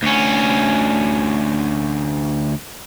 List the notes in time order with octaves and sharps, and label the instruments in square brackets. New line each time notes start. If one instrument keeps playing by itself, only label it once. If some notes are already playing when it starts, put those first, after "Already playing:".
[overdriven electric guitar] D2 C#4